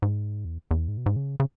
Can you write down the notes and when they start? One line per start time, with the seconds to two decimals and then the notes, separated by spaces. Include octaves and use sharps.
0.02 G#2
0.45 E2
0.71 E2
0.88 G#2
0.97 B2
1.06 G#2
1.16 C#3
1.40 C#3